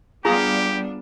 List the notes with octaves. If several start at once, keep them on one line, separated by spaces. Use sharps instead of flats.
G3 B3 D4 F4 G4 G#4 A#5